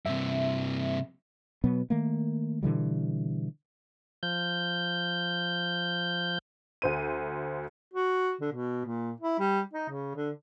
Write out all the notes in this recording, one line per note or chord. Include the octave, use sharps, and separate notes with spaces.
G2 C3 E5
B2 F#3 B3
D#3 A3 A#3
B2 D3 E3 G3
F3 G6
D2 C5 D#7
F#4
D3
B2
A#2
E4
G3
D#4
C#3
D3